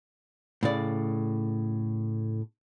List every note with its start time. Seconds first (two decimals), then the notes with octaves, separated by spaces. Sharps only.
0.63 A2 C#3 D5